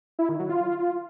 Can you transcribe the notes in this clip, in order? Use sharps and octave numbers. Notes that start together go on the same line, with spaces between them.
E4
D#3
F#3
F4